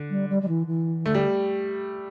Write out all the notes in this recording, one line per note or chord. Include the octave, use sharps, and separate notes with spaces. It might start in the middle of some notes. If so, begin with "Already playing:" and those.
Already playing: D3
G3
G3
G3
E3
E3
D3 A3
G3